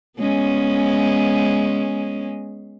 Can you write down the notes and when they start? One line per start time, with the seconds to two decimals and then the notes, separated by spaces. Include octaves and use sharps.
0.19 G#3 B3 C#4